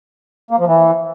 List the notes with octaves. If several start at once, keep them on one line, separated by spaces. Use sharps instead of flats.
A#3
F3
E3